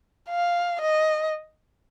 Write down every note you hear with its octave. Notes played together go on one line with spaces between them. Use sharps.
F5
D#5